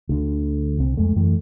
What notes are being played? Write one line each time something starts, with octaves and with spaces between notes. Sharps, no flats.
D2 D3
C2 C4
F2 G#3 A3
F#2 E3 A3